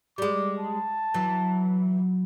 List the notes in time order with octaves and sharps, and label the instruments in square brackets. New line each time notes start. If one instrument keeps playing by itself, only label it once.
[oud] G3 G#3 [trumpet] D6
[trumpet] A5
[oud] E3 [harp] F#3